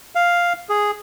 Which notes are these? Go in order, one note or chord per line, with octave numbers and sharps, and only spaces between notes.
F5
G#4